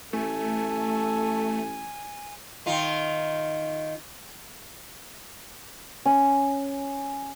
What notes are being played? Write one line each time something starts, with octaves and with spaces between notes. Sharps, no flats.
A1 A3 A4 G#5
D#3 F4
C#4